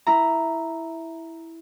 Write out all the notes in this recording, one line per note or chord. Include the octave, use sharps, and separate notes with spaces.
E4 A#5